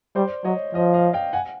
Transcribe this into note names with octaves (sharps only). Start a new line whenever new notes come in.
G3 C5 D5
F#3 C#5 D#5
F3 D#5 F5
D#5 F5
F5 G5
F#5 G#5